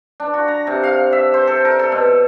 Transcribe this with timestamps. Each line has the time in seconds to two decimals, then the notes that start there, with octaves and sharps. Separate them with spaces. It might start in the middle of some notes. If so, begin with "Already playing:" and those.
0.20 D4
0.34 F#4
0.48 A#5
0.67 C3
0.83 F5
1.13 E5
1.34 C5
1.47 A4
1.65 A#4
1.79 A4
1.92 B2